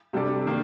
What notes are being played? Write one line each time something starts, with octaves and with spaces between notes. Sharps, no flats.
C3 G3 D4 A4 D5
D#3 A#3 D4